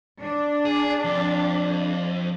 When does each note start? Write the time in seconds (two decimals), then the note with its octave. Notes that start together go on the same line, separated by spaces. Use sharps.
0.21 D4
0.65 G#4
1.05 F2